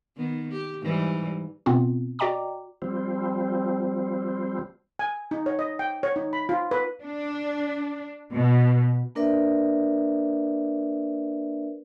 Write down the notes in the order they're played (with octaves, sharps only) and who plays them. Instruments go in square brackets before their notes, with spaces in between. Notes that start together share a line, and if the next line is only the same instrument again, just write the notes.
[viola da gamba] D#3 B3
G4
G#2 E3 G3
[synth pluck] B2 B3 C4 F4
F#4 D5 D#5 G5 A#5 D6
[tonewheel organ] F3 G3 C4
[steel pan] G#5
D#4
C#5
D#5
G5
C#5
D#4
B5
F4
B4
[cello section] D4
B2
[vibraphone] A#3 D4 A#4 B4 D5 E5